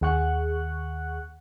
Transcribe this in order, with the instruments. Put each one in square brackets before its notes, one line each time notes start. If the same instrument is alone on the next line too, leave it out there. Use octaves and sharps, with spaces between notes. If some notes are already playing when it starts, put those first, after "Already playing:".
[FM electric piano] D#2 G#4 F#5 C#6 F#6